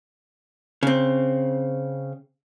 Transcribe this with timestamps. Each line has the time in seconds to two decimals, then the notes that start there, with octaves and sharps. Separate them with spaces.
0.83 C#3 C4